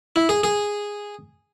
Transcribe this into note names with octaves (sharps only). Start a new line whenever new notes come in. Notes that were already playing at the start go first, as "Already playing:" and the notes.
E4
G#4
G#4